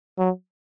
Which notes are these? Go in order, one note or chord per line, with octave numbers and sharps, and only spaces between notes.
F#3